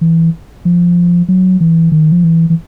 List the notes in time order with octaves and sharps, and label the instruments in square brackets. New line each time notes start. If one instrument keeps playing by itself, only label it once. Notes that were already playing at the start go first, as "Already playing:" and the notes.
[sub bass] E3
F3
F#3
E3
D#3
F3
E3
E3